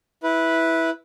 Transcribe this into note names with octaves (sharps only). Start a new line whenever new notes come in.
E4 B4